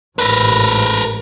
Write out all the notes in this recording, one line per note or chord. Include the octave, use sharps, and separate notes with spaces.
A1 G#2 A#4 B4